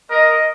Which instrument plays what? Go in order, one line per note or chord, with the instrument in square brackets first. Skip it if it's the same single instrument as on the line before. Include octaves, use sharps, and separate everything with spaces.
[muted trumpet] A#4 [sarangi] D#5